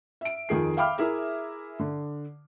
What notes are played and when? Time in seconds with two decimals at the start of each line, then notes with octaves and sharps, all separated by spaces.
0.21 E5 D7
0.49 F2 D#3 G#4 C7
0.77 E5 F5 G5 B5 D6 F6
0.98 E4 G#4 A#4 E5
1.80 D3